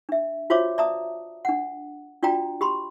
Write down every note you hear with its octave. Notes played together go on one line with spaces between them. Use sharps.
D4 E5
F4 F#4 C5 C#5 E5 D6
D5 E5 A5 A#5 D#6
D4 F#5
D4 F4 F#4 D5 G5 A#5
G4 B5 C6